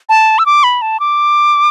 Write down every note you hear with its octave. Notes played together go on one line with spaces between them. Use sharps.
A5
E6
D6
B5
A5
D6